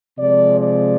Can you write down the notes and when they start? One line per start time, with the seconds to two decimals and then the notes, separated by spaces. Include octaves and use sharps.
0.18 C3 F3 G#3 D5
0.59 D5